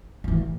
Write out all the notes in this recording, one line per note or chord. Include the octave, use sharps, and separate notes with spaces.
F#3
A1 E3